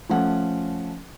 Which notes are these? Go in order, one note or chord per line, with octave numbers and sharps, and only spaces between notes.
F3 A3 C#4 F#5